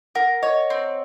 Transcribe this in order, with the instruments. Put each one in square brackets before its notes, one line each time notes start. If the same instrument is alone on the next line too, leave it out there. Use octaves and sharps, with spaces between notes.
[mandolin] A#4 [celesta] F#5
[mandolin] C#5 [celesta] D#5
[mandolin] C4